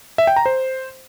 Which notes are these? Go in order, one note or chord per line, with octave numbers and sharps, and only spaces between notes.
E5
G5
A#5
C5